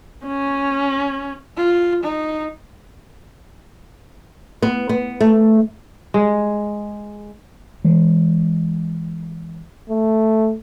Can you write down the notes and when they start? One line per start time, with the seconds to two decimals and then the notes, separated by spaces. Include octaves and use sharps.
0.26 C#4
1.57 F4
2.03 D#4
4.62 B3
4.89 B3
5.21 A3
6.14 G#3
7.84 E3 G#3
9.89 A3